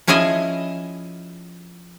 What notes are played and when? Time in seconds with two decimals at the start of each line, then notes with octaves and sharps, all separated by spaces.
0.07 F3 C#4 E4 G#4 D#5 G#5